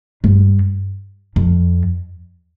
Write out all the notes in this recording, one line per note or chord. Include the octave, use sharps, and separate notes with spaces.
G2
F2